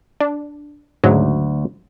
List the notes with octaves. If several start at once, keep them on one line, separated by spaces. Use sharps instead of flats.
D4
D2 G#2 C#3 F#3